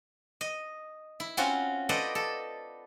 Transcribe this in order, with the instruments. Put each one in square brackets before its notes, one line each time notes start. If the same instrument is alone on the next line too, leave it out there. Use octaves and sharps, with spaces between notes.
[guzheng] D#5
E4
C4 C#4 F4 F#4
A4 B4 C5 D5 D#5
A4